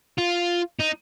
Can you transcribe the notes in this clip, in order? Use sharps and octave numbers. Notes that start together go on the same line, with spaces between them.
F4
D#4